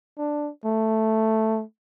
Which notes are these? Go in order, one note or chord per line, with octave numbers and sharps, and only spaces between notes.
D4
A3